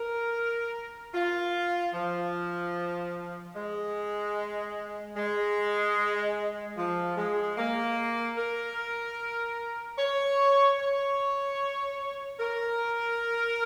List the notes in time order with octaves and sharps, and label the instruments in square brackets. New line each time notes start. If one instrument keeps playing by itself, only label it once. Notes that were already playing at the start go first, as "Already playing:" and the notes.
Already playing: [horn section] A#4
F4
F3
G#3
G#3
F3
G#3
A#3
A#4
C#5
C#5
A#4